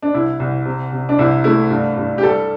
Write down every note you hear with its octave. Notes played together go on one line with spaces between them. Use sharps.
D4
C2 E4
C2
C3
C3
D4
C2 E4
A3 E4
G2
G2
G4
G3 A4